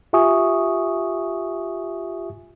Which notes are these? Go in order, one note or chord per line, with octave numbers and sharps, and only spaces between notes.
F4 G4 E5 G#5 C#6 D#6